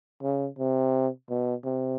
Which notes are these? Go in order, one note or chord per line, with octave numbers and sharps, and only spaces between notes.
C#3
C3
B2
C3